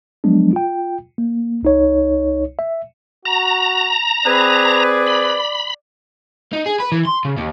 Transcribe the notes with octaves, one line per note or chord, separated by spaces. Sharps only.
F3 F#3 G#3 B3 D4
F4 G5
A#3
C2 D#4 C#5
E5
F#4 A#5
C4 G#4 B4 D5
B5
D#4
G#4
B4
E3
C6
C#3
D#2